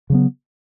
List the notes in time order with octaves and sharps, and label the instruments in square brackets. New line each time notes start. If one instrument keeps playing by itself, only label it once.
[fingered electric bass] C#3 F#3 B3